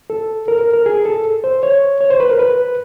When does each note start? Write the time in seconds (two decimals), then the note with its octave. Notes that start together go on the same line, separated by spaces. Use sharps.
0.10 A4
0.48 A#4
0.61 A#4
0.73 A#4
0.86 G#4
1.05 A4
1.44 C5
1.63 C#5
2.01 C#5
2.10 C5
2.20 B4
2.30 A#4
2.39 B4